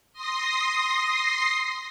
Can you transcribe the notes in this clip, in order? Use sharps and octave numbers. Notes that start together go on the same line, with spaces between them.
C6 D#6 A#6 C7